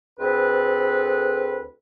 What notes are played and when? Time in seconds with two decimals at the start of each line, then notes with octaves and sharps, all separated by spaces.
0.19 D2 C4 G#4 A4 B4